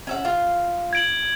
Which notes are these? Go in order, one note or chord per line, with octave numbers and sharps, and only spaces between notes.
C#4 E5 F#5
F4
G#6 D7 F#7